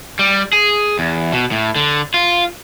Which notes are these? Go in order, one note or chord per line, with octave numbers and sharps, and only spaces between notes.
G3
G#4
E2
B2
A2
D3
F4